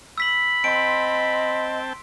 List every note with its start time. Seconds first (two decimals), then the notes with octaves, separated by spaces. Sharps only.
0.18 B5 E6 B6 F#7
0.64 C4 D#5 G5 A5 C6 D7